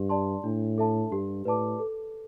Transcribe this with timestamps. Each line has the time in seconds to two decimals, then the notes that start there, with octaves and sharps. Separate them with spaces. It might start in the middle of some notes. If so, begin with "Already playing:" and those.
Already playing: G2 G4
0.09 D5 A5 C6
0.44 A2 D4
0.78 A4 E5 A5
1.11 G2 G4
1.45 A2 B4 D5 A5 D6
1.79 A4